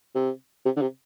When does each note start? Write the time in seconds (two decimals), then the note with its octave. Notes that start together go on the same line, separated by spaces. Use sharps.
0.15 C3
0.65 C3
0.76 D3
0.81 C3